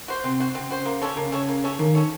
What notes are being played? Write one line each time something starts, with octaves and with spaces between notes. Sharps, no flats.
F#4 C5
C3 C4
F#4 C5
C#3 C4
F#4 C5
A#3
C#4 A4 C#5
C#3 A#3
C#4 A4 C#5
A#3
C#4 A4 C#5
D#3 A#3
C#4 A4 C#5